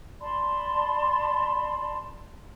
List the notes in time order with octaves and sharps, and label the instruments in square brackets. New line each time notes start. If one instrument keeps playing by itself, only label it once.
[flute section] D5 A5 B5 C6